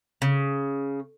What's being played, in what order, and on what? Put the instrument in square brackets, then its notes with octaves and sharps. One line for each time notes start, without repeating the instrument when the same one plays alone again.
[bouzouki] C#3